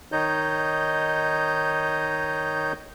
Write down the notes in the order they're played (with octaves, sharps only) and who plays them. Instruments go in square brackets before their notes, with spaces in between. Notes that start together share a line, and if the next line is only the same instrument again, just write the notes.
[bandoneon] D#3 D#4 C#5 D#5 G6